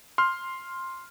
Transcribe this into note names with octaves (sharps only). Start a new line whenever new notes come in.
C6 F6